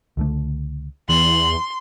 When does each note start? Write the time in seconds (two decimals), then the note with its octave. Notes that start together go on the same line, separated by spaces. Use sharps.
0.17 C#2 D3 A3
1.09 E2 E3 C6 F#7